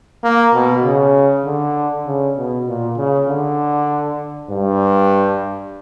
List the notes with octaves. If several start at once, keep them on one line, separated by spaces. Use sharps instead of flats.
A#3
B2
C#3
D3
C#3
B2
A#2
C#3
D3
G2